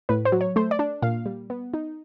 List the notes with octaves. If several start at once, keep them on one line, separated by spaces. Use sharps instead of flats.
A2 B4
C5
F#3
C#5
A3 C5
D5
D4
A#2 F5
G3
B3
D#4